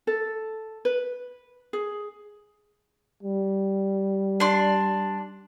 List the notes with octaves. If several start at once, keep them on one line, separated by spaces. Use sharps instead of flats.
A4
B4
G#4
G3
D4 C6